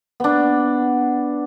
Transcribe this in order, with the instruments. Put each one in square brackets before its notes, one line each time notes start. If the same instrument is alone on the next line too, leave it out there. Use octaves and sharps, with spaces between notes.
[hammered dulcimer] B3 D4